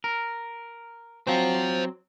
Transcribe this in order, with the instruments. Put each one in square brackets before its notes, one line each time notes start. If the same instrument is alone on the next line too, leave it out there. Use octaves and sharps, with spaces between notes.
[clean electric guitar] A#4
[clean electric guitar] F#3 C4 [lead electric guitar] C5 F5